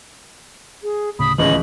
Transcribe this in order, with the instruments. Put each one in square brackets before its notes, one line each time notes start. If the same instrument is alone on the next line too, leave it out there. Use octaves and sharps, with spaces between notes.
[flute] G#4
[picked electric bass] D2 A2 C#3 [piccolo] B5 [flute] D#6
[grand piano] D1 C#2 C#4 [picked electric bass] D#3 E3 A3 [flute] D#5 [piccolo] F#7